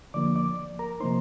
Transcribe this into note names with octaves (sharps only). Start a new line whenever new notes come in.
D3 F3 A#3 D5 D6
D5 D6
A#4 A#5
C3 F3 A#3 D#4 C5 C6